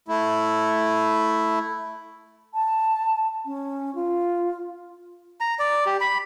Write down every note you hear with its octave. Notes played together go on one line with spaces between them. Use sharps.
A3 E4
A5
C#4
F4
A#5
D5
G4
B5